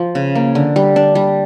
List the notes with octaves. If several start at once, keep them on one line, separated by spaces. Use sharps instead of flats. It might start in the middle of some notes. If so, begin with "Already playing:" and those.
Already playing: F3
C#3
A#3
D3
G3
D4
G3